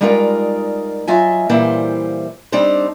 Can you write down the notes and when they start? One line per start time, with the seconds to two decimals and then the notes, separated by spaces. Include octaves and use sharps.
0.01 G3 G#3 D#4 F4 A#4 D5
1.08 F#3 F4 D#5 E5 G#5
1.49 A#2 E3 G3 E4 C5 F5
2.52 G3 C4 D4 D#4 C5